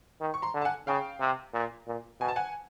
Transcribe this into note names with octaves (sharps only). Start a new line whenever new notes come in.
D#3
C#6
A#5 C6
D3
A5
F#5 G#5
C#3 F5 G5
C3
A#2
A#2
B2 G#5
A5
F#5 G#5